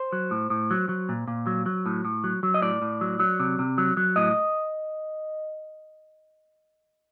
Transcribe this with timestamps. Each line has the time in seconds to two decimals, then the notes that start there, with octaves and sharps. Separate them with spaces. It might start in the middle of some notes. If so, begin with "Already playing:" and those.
Already playing: C5
0.12 F#3
0.31 A2
0.50 A2
0.71 F#3
0.89 F#3
1.09 A#2
1.28 A#2
1.47 F#3
1.66 F#3
1.86 A2
2.05 A2
2.24 F#3
2.43 F#3
2.54 D#5
2.62 A2 D5
2.82 A2
3.01 F#3
3.20 F#3
3.39 C3
3.59 C3
3.78 F#3
3.97 F#3
4.16 A2 D#5